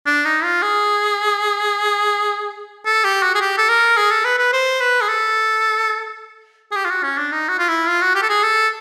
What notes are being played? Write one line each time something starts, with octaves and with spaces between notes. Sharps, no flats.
D4
D#4
F4
G#4
A4
G4
F#4
G#4
G4
A4
A#4
G#4
A4
B4
B4
C5
B4
G#4
A4
G#4
G4
F4
F#4
C#4
D4
D#4
F#4
F4
E4
F4
F#4
G4
A4
G#4
A4